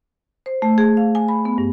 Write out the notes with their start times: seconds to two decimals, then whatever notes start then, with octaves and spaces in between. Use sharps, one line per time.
0.46 C5
0.62 A3
0.78 G#4
0.97 F5
1.15 G#5
1.28 B5
1.45 B3
1.58 G2